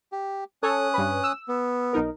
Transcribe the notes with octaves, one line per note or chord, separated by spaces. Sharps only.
G4
C#4 A4 C#5 D#6 F#6
G2 B4
E6
B3
B1 D#4 A#4